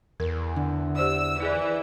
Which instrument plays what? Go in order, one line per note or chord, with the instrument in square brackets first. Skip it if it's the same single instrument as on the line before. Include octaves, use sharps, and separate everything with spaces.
[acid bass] E2 [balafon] A#4
[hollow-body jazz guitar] D3
[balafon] G4 C5 D5 [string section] E6
[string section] E3 [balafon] E4 G#4 D5